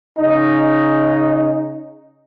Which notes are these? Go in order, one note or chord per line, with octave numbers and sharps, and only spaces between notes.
C#3 D#4